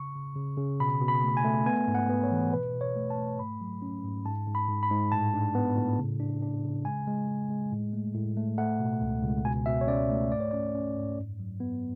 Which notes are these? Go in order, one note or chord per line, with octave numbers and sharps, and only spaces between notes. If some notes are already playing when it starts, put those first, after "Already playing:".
Already playing: C#3 C#6
C#3
C#3
C#3
B2 B5
B2
B5
A3
G#5
A3
B3 G#5
G#2
F#5
B3
C#5
E3
B2 B4
B2
C#5
A3
A5
A3
G#2 B5
F#3
C#4
G#2
G#2 A5
G#2
B5
G#2
B5
G#2
A2 A5
D4
B3
A2
C#3
D4
D4
C#3
G#3 G#5
G#3
G#3
G#3
A2
A3
A2
A3
A3 F#5
B2
C#2
C#2
B2 G#5
B2 E5
C#5
C#4 D5
A3
G#2 D5
C#5
C#4 D5
C#4
G#2
F#2
F#3
B3